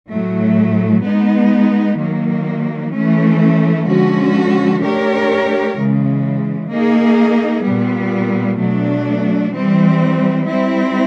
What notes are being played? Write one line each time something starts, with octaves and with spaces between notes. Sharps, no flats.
A2 F#3 A3
G#3 B3 D#4
D#3 F#3 A#3
E3 A3 C#4
D3 F3 G#3 C#4 F#4
A3 D4 G4 A#4 C#5
C#3 E3 G#3
A#3 D#4 G#4
A#2 G3 B3
B2 F#3 A3 D4
E3 G3 C4
G3 C4 E4